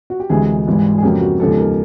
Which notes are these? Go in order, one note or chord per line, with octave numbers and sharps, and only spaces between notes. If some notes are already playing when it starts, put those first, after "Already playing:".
F#4
G4
D2 C3 E3 G#3 G#4
G#1 G#2 E3 G3
G#4
F2 C#3 F#3 A#3 G4
F#4
D#2 C#3 F3 G#3 B3 A4
A#4